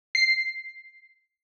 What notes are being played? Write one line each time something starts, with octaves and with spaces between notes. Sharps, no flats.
C7